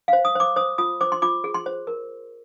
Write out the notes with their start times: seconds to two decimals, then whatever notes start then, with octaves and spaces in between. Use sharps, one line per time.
0.08 C5 F5
0.25 D#6
0.35 C5 D6
0.56 C5 D#6
0.78 F4 D#6
1.01 C5 D6
1.12 C6
1.22 F4 D6
1.44 G#4
1.54 C6
1.66 C5
1.87 A#4